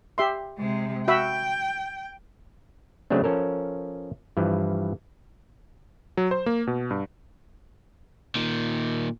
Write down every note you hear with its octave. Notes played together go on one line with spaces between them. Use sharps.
G4 E5 C6
C3 G#3
F#4 E5 G5 B5
C#3 F#3 A3 C4 D4
F3 C#4 A4 A#4
G2 E3 F3
F#3
C5
A#3
B2
G2
A#2 D#3